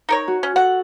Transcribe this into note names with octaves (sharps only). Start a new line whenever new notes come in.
D#4 A#4 C#5
F#4
C#4
F#4 A4 F#5